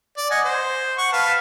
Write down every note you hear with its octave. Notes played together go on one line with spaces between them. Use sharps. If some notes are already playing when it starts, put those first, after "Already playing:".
D5
D#5 F#5 G#5
C5
F#5 C#6
B4 F5 A5